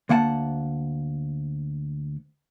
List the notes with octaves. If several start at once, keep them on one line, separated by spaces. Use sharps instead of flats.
D2 A#3 F#5 G#5 A5